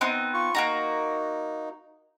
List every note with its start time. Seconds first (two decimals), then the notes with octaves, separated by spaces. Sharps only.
0.01 B3 C4 D#4
0.34 F4 C#6
0.55 A#3 D#4 F#4 A#5